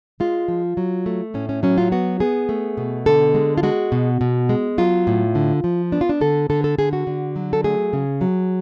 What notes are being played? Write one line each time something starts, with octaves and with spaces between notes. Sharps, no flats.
G#3 F4
F3
F#3
A3
A2 C#4
C#4
F#3 C#4
F4
B3 F#4
B3 G#4
A3
B2
D3 A4
G#3
F4
G#3 F#4
B2
B2
G#3
F#3 F4
A2
D3
F3
B3 D4
F4
D4
D3 A4
D3 A4
A4
D3 G#4
F#4
D3
F#3
A4
A3 G#4
C#3
F#3